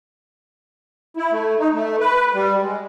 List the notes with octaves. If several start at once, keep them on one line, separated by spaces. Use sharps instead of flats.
E4
A3
D#4
A3
B4
G3
G#3